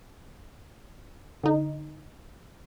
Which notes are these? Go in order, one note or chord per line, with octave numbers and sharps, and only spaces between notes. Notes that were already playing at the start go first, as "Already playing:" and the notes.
D3 D#4